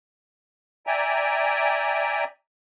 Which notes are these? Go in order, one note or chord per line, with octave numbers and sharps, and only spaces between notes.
D5 E5 G5 G#5 A#5